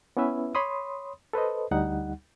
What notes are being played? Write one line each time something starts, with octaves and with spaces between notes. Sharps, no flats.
B3 C#4 E4 B4 E5
C#5 B5 C6 D#6
A4 B4 C5 D#5
D2 G3 D#4 F#5